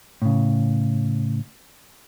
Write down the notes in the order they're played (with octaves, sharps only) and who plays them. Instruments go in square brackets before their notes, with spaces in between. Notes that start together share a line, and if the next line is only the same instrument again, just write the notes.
[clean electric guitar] A2 C#3